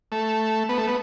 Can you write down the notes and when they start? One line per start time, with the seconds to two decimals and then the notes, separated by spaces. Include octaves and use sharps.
0.12 A3
0.69 B3
0.78 A3
0.88 B3